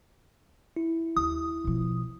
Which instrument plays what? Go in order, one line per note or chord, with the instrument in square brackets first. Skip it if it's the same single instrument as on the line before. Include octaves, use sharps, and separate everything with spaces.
[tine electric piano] E4
[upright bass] D#2 [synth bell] D#6
[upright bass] B2 F3